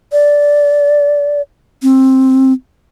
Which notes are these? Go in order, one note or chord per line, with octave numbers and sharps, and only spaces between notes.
D5
C4